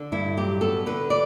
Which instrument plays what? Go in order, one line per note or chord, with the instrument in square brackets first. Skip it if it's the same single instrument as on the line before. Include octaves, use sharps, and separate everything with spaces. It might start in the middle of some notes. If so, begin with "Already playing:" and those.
Already playing: [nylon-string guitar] D3
G2 E4
F#3 G4
B3 A4
D3 B4
D5